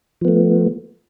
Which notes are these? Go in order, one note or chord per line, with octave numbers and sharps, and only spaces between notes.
F3 A3 B3